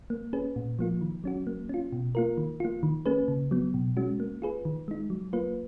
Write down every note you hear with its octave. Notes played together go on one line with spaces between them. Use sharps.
A#3
C#4 G#4 B4
A#2
F3 A#3 F4
D#3
F#3 C#4 F#4
A#3
C#4 F4
B2
A#3 F4 A#4
D#3
A#3 F4
D#3
A#3 C#4 G#4 B4
C#3
F#3 B3
B2
G#3 C#4 F#4
A#3
F4 G#4 B4
D#3
G#3 D#4
F#3
A#3 F4 B4